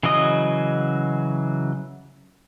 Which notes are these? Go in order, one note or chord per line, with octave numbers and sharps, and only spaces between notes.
C#3 E3 F#3 D#5 D#6